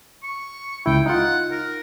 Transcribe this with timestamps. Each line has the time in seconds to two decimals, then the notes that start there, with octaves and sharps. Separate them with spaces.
0.23 C#6
0.86 C#2 E4 G5
1.06 D#4 F4 F#5
1.51 A#4